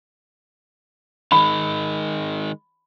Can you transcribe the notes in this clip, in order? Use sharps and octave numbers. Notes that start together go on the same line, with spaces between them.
D#3 G#3 B5